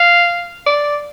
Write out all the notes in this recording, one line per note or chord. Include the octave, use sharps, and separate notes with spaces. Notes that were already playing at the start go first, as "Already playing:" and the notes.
Already playing: F5
D5